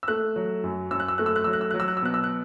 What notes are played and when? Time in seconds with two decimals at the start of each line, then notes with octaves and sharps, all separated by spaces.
0.03 E6
0.08 A3 F#6
0.36 F#3
0.64 F#2
0.91 F#2 E6
1.00 F#6
1.08 E6
1.18 A3 F#6
1.26 E6
1.36 F#6
1.44 F#3 E6
1.53 F#6
1.61 E6
1.71 F#3 F#6
1.80 E6
1.88 F#6
1.97 E6
2.02 B2 F#6
2.14 E6
2.24 F#6